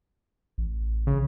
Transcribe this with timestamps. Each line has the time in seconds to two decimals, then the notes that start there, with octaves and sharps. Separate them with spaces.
0.58 A1
1.07 C#3